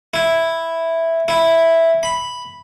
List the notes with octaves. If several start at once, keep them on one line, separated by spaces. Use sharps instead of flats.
E4
E4
B5